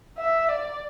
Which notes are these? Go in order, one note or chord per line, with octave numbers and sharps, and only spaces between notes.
E5
D5